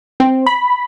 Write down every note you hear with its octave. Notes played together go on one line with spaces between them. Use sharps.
C4
B5